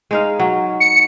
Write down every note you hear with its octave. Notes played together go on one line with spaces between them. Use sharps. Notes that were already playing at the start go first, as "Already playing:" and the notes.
G#3 D#4 F5
F#3
C#7